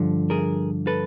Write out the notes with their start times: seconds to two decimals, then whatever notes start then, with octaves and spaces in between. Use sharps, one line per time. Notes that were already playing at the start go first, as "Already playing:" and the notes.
Already playing: G2 D3 F3
0.30 G#4 A#4
0.87 A4 B4